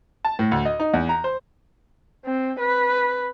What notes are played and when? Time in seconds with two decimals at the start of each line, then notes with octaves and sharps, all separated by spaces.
0.25 A5
0.39 A2
0.51 D2
0.65 D#5
0.80 D#4
0.93 E2
1.09 A#5
1.24 C5
2.26 C4
2.60 B4